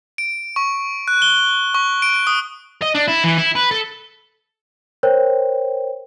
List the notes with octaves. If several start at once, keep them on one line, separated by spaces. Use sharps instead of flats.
D7
C#6
F#6
G7
C#6
D7
D#6
D#5
D4
E4
E3
E4
B4
A4
A#4 C5 C#5 G5